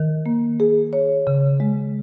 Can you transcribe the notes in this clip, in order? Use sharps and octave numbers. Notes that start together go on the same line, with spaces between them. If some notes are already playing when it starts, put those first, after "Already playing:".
Already playing: D#3 A#4
A#3
G#4
C#5
C#3
G#3